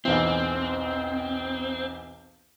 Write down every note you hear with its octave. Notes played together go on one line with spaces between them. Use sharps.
B1 E2 E3 C4